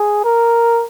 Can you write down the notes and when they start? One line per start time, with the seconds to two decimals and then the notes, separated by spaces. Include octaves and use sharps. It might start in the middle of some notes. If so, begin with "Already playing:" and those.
Already playing: G#4
0.24 A#4